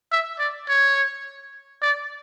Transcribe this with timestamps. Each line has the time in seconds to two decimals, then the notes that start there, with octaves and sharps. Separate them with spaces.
0.12 E5
0.39 D5
0.69 C#5
1.82 D5